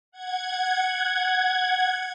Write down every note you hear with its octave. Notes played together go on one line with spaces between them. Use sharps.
F#5 G#6